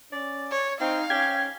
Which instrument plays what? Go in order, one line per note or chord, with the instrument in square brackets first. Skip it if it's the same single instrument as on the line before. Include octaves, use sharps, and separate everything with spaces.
[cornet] C#4 [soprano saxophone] D5
[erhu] C#5
[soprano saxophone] C4 [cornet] D#4 [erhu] F5
[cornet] C#4 [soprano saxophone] G4 [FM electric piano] G#6